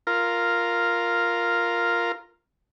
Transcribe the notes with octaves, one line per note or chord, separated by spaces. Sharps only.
F4 A#4